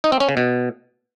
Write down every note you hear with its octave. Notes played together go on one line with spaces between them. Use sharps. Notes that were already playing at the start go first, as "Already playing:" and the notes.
D#4
C4
C#4
C#3
B2